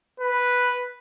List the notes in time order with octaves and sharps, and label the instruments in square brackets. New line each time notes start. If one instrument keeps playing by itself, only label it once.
[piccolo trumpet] B4